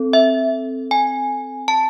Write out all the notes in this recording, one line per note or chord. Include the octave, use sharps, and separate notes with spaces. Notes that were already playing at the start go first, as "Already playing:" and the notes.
Already playing: C4 A4
E5
G#5
A5